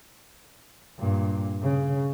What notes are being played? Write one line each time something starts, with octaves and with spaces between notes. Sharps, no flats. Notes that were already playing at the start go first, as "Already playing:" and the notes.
G2 A#2
C#3